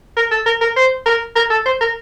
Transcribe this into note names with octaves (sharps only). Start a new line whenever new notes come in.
A#4
A4
A#4
A#4
C5
A#4
A#4
A4
C5
A#4